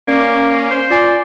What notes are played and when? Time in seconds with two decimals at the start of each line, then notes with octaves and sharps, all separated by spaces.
0.08 A#3 C#4 D5 D6
0.71 C5
0.90 F4 D5 G#5